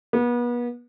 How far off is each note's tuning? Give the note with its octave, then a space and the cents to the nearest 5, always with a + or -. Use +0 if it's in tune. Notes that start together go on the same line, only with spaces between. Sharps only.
B3 -35